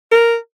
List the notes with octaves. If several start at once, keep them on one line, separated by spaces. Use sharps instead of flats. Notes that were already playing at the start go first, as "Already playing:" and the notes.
A#4